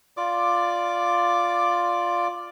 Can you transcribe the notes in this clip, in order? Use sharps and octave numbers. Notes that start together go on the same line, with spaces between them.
F4 D5 D6